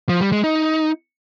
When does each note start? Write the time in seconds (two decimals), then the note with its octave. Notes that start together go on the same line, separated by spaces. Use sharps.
0.09 F3
0.21 G3
0.32 G#3
0.44 D#4